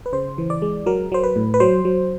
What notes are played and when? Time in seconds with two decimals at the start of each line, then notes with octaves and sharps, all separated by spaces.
0.06 B4
0.13 C#3 C5
0.38 E3
0.50 D5
0.62 G#3
0.86 F#3 A#4
1.12 F#3 C5
1.24 B4
1.36 A2
1.54 B4
1.60 F#3 C5
1.85 F#3